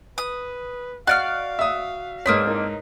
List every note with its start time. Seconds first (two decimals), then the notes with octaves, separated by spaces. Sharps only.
0.18 B4 D#6
1.07 F#4 D5 D#5 F5 F#5 F6 F#6
1.59 E5 D#6 E6
2.26 G#2 A#3 C4 D4 B4 C#5 D#6 B6
2.47 D#4 E4 A#4